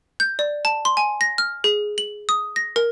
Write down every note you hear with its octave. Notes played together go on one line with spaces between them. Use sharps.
G6
D5
A5
C6
G#5
A#6
F6
G#4
F#7
D#6
A#6
A#4